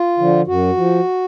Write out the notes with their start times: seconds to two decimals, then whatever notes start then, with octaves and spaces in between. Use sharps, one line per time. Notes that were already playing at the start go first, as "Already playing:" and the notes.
Already playing: F4
0.18 D3 F3
0.47 F#2 F#4
0.77 F3